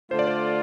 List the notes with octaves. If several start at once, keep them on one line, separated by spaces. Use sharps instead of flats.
D3 A3 D4 F4 C5
D5
C5